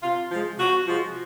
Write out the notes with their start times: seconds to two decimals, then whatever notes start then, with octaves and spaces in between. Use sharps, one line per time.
0.02 C3 F4
0.31 F3 G#3
0.58 C3 F#4
0.87 F3 G#3